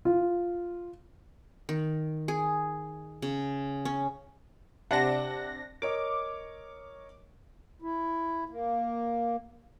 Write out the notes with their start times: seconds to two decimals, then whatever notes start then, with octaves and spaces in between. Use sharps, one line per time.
0.05 F4
1.69 D#3
2.28 G#4
3.22 C#3
3.85 C#4
4.91 C3 D4 F#5 A#6
5.82 A#4 C#5 D#5 D6
7.82 E4
8.49 A#3